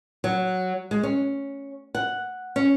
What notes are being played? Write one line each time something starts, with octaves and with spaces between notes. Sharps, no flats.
F#3
G#3
C#4
F#5
C#4